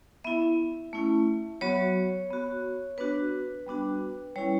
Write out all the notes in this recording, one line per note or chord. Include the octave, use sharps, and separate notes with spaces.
B3 E4 E5
A3 C#4 E4
F#3 B3 F#4 C#5
B3 F#4
B3 D4 F#4 B4
G3 B3 D4 F#4
G3 C#4 E4 C#5